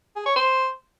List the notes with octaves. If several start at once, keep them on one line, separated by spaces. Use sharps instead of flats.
G#4
C#5
C5